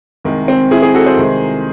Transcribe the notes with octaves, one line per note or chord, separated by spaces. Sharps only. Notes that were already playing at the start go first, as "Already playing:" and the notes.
C2 C3 D#3 G#3
C4
E4 G#4
E4 G#4
F#4 A4
G#4 C5
C2 C3 D#3 G#3